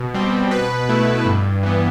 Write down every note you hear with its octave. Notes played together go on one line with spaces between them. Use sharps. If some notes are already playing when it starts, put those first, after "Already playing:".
Already playing: B2
G3 C4
B2 B4
A3 E4
G2
E3 B3